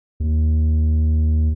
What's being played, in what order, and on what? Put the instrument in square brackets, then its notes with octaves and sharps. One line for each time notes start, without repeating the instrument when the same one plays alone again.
[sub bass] D#2